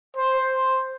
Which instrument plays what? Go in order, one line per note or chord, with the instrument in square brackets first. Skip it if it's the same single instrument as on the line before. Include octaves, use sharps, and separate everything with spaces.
[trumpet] C5